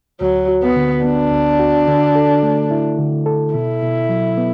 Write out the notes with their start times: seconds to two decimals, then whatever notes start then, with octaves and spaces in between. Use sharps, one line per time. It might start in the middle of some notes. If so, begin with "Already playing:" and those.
0.20 D2 F#3
0.49 F#4
0.63 B3
0.76 D3
1.04 B3 D4
1.32 D2
1.60 F#4
1.88 D3
2.15 A4
2.43 A3
2.71 E4
2.99 D3
3.26 A4
3.54 B2 E4
3.82 B2
4.09 F#3
4.38 B3